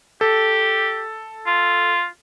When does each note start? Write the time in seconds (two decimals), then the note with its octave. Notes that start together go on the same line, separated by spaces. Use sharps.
0.21 G4 A4
1.47 F4